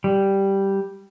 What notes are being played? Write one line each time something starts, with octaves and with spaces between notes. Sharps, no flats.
G3